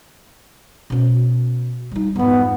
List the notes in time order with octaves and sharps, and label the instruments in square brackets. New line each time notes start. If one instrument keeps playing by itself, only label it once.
[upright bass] B2 C#4
G3 D#4
[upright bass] F2 G#2 [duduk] B3